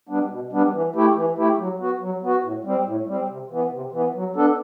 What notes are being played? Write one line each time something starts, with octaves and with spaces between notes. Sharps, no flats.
G3 B3 D4
B2
G3 B3 D4
E3
A3 E4 G4
E3
A3 E4 G4
F#3
B3 F#4
F#3
B3 F#4
A2
G3 C4
A2
G3 C4
C3
E3 B3
C3
E3 B3
F#3
B3 D4 A4